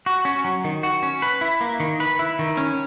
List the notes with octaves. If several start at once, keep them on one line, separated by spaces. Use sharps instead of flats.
F#4
C#4
F#3
D#3
F#4
C#4
B4
E4
A#3
D#3
B4
E4
D#3
C#4